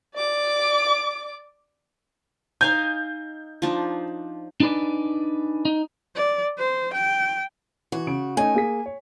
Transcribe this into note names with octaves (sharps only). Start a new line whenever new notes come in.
D5 D6
D#4 F5 G#5 G6
F3 D4 D#4
D4 D#4 G#4 B4 D5
D#4
D5
C5
G5
E3 F#4
C#3 D7
A3 C#4 D#4 G#5
A#3 G#4 B6
C#5